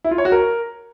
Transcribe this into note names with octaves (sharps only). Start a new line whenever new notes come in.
E4
F4
C#5
F#4
A#4